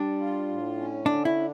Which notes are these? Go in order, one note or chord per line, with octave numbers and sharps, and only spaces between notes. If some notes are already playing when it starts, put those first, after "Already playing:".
Already playing: G3 D4
F4
A2
C#4
D3 D4
E4
D4